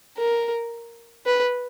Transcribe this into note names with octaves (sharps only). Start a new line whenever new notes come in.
A#4
B4